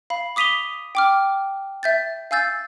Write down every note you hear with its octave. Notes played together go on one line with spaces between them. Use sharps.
F5 B5
D6 D#6 B6 D#7 F7 G7
G5 D6 F6
E5 G6 A6
F5 G#5 E6 G6 A6